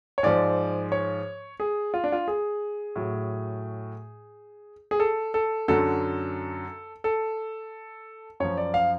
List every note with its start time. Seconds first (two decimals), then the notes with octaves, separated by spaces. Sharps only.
0.18 C#5
0.23 G#2 F3 D5
0.92 C#5
1.60 G#4
1.94 F4
2.04 D4
2.12 F4
2.28 G#4
2.96 A2 F#3
4.91 G#4
5.00 A4
5.34 A4
5.68 F#2 D3 F#3 A4
7.04 A4
8.40 F#2 F3 C#5
8.57 D5
8.74 F5